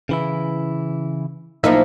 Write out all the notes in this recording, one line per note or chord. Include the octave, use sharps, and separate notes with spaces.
C#3 E3 E4
B1 F3 A#3 D#4 E4 E5